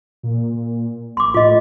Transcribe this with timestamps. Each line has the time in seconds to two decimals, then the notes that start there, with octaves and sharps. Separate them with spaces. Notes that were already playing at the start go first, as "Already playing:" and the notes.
0.23 A#2
1.17 A#1 C6 D6
1.34 A2 F4 D#5